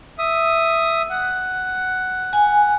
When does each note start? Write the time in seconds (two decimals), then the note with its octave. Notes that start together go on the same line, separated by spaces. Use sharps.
0.18 E5 D#6
1.10 F#5
2.33 G#5